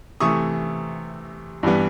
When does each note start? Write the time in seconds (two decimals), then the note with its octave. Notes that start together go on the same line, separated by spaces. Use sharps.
0.20 C3 E3 A3 C#6 D#6
1.63 G2 E3 G3 B3